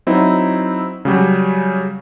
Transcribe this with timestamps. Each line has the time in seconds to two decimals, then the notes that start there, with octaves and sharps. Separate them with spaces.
0.07 F#3 C4 D#4 E4
1.05 C#3 F#3 G3